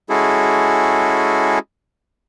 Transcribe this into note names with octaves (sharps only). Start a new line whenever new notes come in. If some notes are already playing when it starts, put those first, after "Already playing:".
G#3 C#4 E4 F#4 G#4 A4